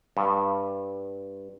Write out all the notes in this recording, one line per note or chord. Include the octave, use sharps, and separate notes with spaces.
G2